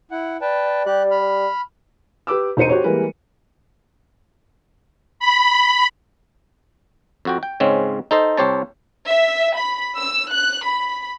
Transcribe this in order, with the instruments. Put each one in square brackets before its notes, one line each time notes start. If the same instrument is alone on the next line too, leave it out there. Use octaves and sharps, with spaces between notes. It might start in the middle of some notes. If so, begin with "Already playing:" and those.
[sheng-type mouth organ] E4 F#5
[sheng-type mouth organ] B4 G5 A5 [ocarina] D5
[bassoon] G3 [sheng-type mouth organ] G4 F#6
[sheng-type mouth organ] B5 F6
[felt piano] G4 B4 D6 E6
E1 D#4 C5 C#7 D#7
F#4 G4 C5 C#5
E3 G3 G#3 A#3 A#4 B4
[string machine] B5
[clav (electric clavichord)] F2 F#4 G5
G5
G#2 C#3 G#3 C4 C#4
D#4 A4 C5 D#5
C2 G4 C5 C#5 A5
[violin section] E5
B5
E6
F#6
B5